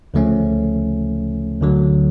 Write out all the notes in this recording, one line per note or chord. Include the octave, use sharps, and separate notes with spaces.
D2 C#3 F3 A3 C#4
D2 D3 F#3